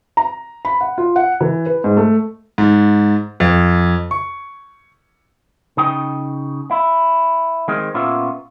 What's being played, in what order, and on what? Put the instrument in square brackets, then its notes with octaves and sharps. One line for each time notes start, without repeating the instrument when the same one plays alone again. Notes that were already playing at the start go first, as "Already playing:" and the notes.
[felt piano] A#5
B5
F#5
F4
F#5
E3
B4
G#2
A3
[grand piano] G#2
F2
C#6
[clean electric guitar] C#3 D#4 G5
E4
D#3 G#3 C4
A#2 B3 C#4 F4 E5